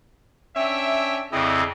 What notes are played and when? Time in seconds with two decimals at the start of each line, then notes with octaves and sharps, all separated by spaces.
0.56 C#4 D4 E5 G5
1.33 F2 C#3 C4 E4 D5 D#5